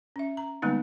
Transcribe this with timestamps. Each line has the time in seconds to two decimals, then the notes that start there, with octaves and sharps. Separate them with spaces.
0.16 C#4 E5
0.37 A#5
0.62 D3 G3 G#3 A#3 B3 D#4